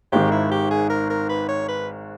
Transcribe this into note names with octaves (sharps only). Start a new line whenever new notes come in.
G#1 G#2 D#3 G4
E4
G4
G#4
A#4
A#4
B4
C#5
B4